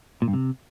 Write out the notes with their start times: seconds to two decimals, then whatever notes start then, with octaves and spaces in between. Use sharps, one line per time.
0.22 A#2
0.28 G2
0.33 C3